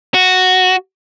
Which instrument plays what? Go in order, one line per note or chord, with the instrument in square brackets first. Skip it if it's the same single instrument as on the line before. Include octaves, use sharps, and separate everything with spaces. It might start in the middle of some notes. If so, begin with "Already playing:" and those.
[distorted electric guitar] F#4